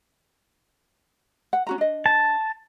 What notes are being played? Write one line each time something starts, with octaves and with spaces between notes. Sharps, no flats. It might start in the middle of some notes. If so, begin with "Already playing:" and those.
F#5
C#4 F#4 A#5
D4 D#5
A5